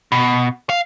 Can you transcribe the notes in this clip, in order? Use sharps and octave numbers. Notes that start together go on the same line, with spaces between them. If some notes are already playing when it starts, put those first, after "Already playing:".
B2
F5